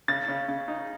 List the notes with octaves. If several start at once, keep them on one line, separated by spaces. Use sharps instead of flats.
C#3 A6
C#3
C#3
D#4